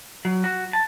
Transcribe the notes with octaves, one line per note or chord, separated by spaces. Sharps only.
F#3
F#4
A5